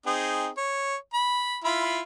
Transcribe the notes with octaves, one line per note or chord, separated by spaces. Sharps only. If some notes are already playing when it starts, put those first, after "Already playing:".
C4 D#4 G#4
C#5
B5
E4 F4 B5